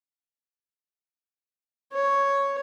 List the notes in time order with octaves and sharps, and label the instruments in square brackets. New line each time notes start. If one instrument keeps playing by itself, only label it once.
[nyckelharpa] C#5